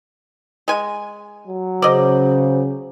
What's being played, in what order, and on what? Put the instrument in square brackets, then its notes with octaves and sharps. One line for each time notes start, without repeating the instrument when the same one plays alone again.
[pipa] G#3 G#5
[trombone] F#3
[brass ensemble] C#3 [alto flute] C5 [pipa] D5 D#5